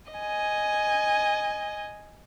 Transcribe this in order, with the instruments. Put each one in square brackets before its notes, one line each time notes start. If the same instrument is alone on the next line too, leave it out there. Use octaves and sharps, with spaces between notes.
[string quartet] D#5 G#5